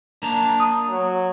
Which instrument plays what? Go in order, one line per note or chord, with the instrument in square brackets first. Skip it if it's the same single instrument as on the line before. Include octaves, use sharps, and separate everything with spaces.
[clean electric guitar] A#3 A5 A#5 [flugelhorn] D4
[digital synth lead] D#6
[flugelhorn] F#3